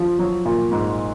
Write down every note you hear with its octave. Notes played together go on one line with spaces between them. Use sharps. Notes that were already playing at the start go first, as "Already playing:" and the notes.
Already playing: F3
F#3
A#2
G#2